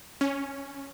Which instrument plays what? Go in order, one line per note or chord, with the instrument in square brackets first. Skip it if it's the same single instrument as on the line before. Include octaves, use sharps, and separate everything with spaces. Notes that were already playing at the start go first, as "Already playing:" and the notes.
[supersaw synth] C#4